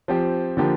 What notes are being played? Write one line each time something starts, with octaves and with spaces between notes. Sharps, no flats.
F3 C4 G4
D3 F3 A#3 G4